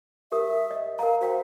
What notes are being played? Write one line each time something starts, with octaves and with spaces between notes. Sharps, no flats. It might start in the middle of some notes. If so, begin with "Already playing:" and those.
G4 A#4 E5 D#6
D#5
A#4 F5 F#5 A#5
F#4 C5 F5 G5